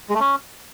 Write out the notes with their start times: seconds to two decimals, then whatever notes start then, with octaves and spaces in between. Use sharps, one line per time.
0.09 G#3
0.15 A3
0.20 C#4